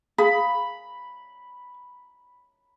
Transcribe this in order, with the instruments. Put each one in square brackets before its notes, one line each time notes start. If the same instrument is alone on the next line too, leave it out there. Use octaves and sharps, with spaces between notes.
[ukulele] G#4 F5 [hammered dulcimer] B5